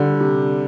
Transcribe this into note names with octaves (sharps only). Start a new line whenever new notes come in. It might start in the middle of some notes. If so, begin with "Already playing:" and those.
Already playing: D3 G3
C3